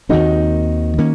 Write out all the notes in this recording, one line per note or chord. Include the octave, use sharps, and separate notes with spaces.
D#2 D#3 A3 C4 D#4 F#4
D#3 A#3 C#4